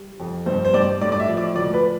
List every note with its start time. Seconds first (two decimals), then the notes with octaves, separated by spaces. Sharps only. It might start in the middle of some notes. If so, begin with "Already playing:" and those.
Already playing: G3
0.20 F2
0.46 G2 C5
0.65 C5
0.74 G2 D5
1.01 A2 D5
1.12 D5
1.20 E5
1.28 F3
1.37 D5
1.56 D2 D5
1.74 B4